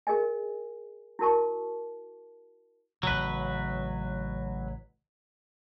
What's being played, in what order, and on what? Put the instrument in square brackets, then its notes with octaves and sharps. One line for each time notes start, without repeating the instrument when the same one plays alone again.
[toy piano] G#4 A#4 D#5 G#5
E4 F#4 A#4 A5 C#6
[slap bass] A1 C#3 [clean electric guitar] F#3 B4